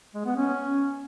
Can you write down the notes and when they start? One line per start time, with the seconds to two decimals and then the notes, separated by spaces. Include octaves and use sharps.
0.15 G#3
0.25 B3
0.36 C#4